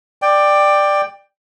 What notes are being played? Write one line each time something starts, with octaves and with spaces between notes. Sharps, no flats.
D5 G5